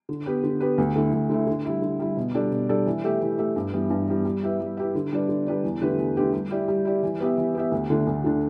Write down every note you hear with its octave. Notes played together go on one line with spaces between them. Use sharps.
D3
B3 G4 B4
D3
B3 G4 B4
D2
D3 A3 E4
D2
D3 A3 E4
D3
G3 E4
D3
G3 E4
B2
G3 D4 A4 D5
B2
G3 D4 A4 D5
E3
A3 G4 E5
E3
A3 G4 E5
G2
E3 G3 B3
G2
E3 G3 B3
G3
E4 G4 B4 E5
G3
E4 G4 B4 E5
D3
G3 D4 B4 D5
D3
G3 D4 B4 D5
E2
D3 A3 G4 B4
E2
D3 A3 G4 B4
G3
E4 G4 D5
G3
E4 G4 D5
E3
B3 G4 E5
E3
B3 G4 E5
D2
D3 A3 D4
D2
D3 A3 D4